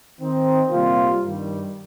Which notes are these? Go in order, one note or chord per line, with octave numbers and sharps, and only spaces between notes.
D#3 C4 D#4
C3 G3 A#3 F4
G2 D#3 G3